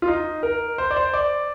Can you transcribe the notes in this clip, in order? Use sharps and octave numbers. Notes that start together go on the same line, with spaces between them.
F4
D#4
A#4
C5
D5
C5
D5